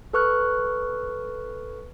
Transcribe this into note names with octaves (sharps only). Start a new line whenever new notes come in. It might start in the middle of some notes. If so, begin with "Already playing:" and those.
A4 B4 C#6 F6 F#6